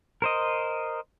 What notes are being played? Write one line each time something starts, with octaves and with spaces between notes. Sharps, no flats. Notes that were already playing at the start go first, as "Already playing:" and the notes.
A#4 C5 D#5